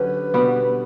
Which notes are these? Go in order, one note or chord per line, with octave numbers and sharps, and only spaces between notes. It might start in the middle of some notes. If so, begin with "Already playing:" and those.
Already playing: D3 F#3 C#4 G4 B4
B2 G3 B3 F#4